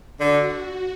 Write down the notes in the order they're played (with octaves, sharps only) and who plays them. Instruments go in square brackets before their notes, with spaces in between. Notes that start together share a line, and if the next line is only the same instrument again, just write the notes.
[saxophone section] D3 [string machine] F#4